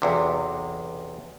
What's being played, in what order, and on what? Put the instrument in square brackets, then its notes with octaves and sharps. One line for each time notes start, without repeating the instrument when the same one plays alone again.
[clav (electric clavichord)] B1 E2 C3